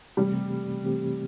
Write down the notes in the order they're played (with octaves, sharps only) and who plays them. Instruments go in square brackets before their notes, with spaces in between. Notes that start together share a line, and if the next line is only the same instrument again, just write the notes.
[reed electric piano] C3 E3 A3 C4 G4 [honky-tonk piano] G3
[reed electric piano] C3 E3 A3 C4 G4